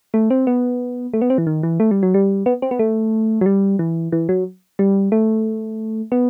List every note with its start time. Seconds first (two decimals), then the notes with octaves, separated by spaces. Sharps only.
0.14 A3
0.30 C4
0.47 B3
1.14 A3
1.21 B3
1.30 C4
1.38 E3
1.47 D#3
1.63 E3
1.80 A3
1.91 G3
2.03 F#3
2.14 G3
2.46 B3
2.62 C4
2.71 B3
2.79 A3
3.41 F#3
3.46 G3
3.79 E3
4.12 E3
4.29 F#3
4.79 G3
5.12 A3
6.12 B3